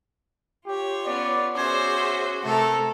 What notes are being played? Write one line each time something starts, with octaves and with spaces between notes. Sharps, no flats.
F4 G4 C#5
B3 C#4 D5
C#4 F#4 G#4 C5 E5 D6 G#6
C3 A3 A4 A#4